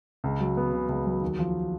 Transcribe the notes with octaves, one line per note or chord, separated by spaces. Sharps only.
C#2
F#3
B3
C#3
C#2
F#3
D#2
F3